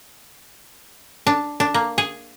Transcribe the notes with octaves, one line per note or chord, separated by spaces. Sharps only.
D4
D4
A#3
G#4